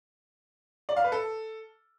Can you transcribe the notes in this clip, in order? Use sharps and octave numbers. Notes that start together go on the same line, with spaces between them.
D5
F5
B4
A4